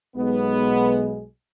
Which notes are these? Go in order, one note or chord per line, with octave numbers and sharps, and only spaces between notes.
B1 G#3 B3